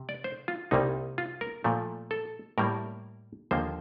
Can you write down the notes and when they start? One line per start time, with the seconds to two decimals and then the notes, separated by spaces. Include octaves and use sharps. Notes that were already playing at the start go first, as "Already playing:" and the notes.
Already playing: C3
0.09 D5
0.24 C5
0.48 F4
0.71 C2 C3 G3 A#3 D#4
1.18 F4
1.41 A#4
1.64 A#2 F3 A3
2.11 A4
2.58 A2 G3 A#3 A#4
3.51 D#2 D3 F3 A#3 C5